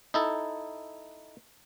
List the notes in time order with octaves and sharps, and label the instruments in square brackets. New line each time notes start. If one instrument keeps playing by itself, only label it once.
[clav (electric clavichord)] D#4 E4 A4